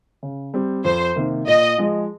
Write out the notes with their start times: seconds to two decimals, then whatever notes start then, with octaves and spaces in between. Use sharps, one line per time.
0.23 C#3
0.54 G3 C4
0.85 F2 C5
1.16 C3 D#3 A#3
1.47 A#2 D#5
1.78 F3 G#3